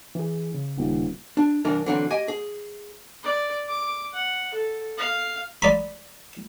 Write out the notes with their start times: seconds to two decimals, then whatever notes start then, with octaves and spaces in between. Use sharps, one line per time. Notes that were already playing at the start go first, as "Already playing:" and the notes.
0.15 E3 G#4
0.54 C#3
0.77 D#1
1.37 D4
1.65 C2 G2 E3 D4 A#4
1.86 D3 E3 F#3 C4
2.10 G4 D#5 G#5
2.28 G#4
3.23 D5
3.68 D6
4.14 F#5
4.54 A4
4.98 F5
5.62 D5 A#5 B5